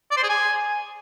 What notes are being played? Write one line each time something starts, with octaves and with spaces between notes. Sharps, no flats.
D5
C5
G#4
G#5